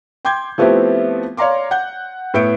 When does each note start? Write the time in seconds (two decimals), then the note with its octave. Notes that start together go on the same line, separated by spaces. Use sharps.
0.25 G5 C6 D6 G6 G#6
0.58 F3 A3 B3 C4 E4 G4
1.37 C#5 D5 F5 A#5 C6 D6
1.71 F#5 G6
2.34 A2 B3 E5 G6 C#7 D7